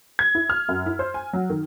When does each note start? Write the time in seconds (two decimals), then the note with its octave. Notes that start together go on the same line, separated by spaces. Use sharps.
0.19 G#6
0.35 E4
0.50 F6
0.69 F#2
0.86 E4
0.99 C5
1.14 G#5
1.33 F#3
1.50 D#3